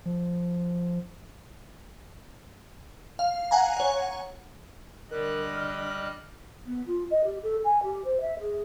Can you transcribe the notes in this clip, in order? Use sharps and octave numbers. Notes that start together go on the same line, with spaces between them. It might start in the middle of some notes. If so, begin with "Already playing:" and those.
F3
F5
F#5 G#5 A#5
C#5 F#5
D3 G3 A#4 D#5 F#6
F6
B3
F4
D#5
G4
A4
G#5
G4
C5
E5
G#4